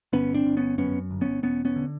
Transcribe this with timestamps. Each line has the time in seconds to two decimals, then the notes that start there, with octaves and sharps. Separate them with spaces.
0.13 G1 B3 C#4
0.34 C4 D4
0.45 G1
0.57 B3 C#4
0.78 F#2 B3 C#4
1.11 G1
1.21 B3 C#4
1.43 E1 B3 C#4
1.65 B3 C#4
1.76 D3